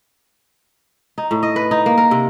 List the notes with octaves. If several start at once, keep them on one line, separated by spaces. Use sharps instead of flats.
D#4
A2
D#5
B4
D#4
A#3
A#4
C3